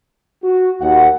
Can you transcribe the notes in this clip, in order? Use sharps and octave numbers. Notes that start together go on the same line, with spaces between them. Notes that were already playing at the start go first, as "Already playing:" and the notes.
F#4
D#2 F#5